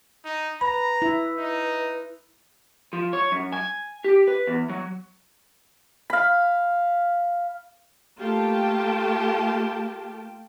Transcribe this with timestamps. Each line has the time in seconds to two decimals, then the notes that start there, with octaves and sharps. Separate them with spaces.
0.25 D#4
0.61 B4 A#5 B5
1.02 E4
1.39 D#4
2.93 F3
3.13 C#5
3.32 F#2
3.52 G#5
4.04 G4
4.28 B4
4.47 E2
4.69 F#3
6.10 F5 B5
8.18 A3 A#3 F4 G4 G5 A5